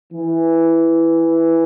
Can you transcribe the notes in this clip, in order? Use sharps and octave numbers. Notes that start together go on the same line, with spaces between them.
E3